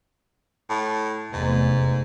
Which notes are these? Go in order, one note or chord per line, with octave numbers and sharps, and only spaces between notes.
A2
F1 E2 G#2 A3